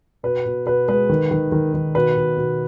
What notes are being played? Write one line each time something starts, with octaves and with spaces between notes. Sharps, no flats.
B2 B4
B2
B2 B4
G#3 B4
D#3
D#3
D#3
D#3
B2 B4
B2
B2